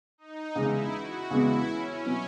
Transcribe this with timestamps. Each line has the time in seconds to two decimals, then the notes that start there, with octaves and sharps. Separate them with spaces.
0.18 D#4
0.55 E2 C#3 G#3 B3 E4
0.93 F#4
1.30 E2 C#3 G#3 B3 E4
1.67 C#4
2.05 B2 F#3 B3 F#4